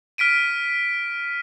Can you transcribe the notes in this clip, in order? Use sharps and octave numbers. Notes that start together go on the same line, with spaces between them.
F6 B6 D7 D#7